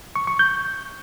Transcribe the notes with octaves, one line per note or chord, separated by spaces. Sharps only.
C#6
C#6
G6